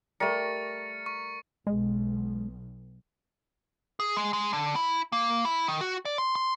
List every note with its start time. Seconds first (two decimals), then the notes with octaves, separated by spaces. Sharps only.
0.20 G3 A3 A#4 C#6 A6 C#7
1.06 C#6
1.67 B1 G#3
4.00 G#4
4.17 G#3
4.33 G#3
4.53 D3
4.76 E4
5.12 A#3
5.45 E4
5.68 D#3
5.81 F#4
6.05 D5
6.18 C6
6.35 C6